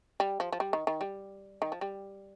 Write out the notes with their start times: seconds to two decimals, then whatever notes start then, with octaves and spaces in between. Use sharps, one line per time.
0.20 G3
0.40 F3
0.52 F3
0.60 G3
0.73 D#3
0.87 D#3
1.01 G3
1.62 D#3
1.72 F3
1.81 G3